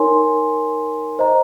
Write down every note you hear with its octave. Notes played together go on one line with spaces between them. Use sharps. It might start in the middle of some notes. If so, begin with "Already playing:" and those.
Already playing: D#4 A#4 C#5 G#5 C6
C5 D#5 A#5